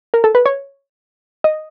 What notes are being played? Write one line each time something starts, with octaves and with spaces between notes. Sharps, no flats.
A#4
A4
B4
C#5
D#5